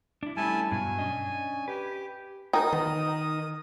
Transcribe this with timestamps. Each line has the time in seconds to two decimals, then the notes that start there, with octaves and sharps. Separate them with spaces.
0.23 D4 E4
0.37 G3 A3 C#4 E4 G#5 A5
0.71 G2 B2 F#3 G#5
0.98 C#4 D4 D#5
1.68 G4 B4
2.53 A#3 D#4 A#4 G5 D#6
2.73 D#3 B3